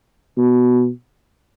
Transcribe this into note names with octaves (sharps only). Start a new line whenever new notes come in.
B2